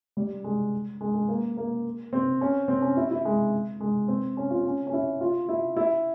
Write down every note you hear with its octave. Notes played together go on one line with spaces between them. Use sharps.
G3
G#3
G#3
G#3
A#3
A#3
C4
C#4
C4
C#4
E4
E4
G#3
G#3
C4
C#4
F4
C#4
C#4
E4
F4
E4
E4